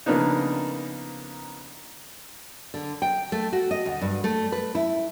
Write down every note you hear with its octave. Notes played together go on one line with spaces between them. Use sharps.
C#3 F3 A#3 B3 D4 D#4
D3
G5
A3
F#4
D#5
D2
G2
A3
B4
E4